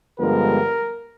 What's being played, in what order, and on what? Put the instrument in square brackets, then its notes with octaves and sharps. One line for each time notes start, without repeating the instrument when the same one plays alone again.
[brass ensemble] G2 D3 F3 G#3 B3 [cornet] A#4